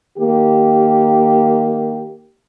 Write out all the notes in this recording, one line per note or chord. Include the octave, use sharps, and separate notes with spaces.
D#3 A#3 G4